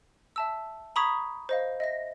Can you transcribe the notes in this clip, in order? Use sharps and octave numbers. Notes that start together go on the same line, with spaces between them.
E5 A5 E6
A#5 B5 C#6 D#6 G#6 B6
C5 D#5 F5
D#5 E5 A#6